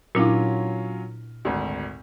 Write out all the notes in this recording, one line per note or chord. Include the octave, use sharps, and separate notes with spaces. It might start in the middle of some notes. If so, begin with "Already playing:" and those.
A#2 F#3 C#4 D4 E4 F4
G#1 D2